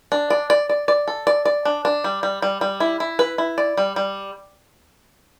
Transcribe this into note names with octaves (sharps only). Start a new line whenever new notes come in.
D4
D5
D5
D5
D5
A4
D5
D5
D4
D4
G3
G3
G3
G3
E4
E4
B4
E4
D5
G3
G3